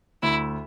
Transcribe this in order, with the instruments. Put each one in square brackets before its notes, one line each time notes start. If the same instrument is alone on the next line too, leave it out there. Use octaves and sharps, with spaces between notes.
[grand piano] D2 [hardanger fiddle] E4